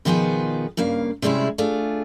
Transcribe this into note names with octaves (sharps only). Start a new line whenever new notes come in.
B2 D#3 F3 B3 F4 G#4
G2 C#3 A#3 F5
C3 G3 G#3 C#4 E4 G#4
A3 D4 F4 G#4